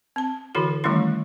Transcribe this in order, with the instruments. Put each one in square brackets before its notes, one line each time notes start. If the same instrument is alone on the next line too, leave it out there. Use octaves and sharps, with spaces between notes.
[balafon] C4 A5
D3 E3 E4 F#4 A4
D#3 E3 G3 A3 C#4 E4